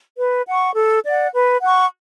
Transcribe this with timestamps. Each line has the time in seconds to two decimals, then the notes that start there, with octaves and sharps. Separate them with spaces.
0.18 B4
0.48 F#5 C#6
0.76 A4
1.06 D5 F#5
1.34 B4
1.63 F#5 C#6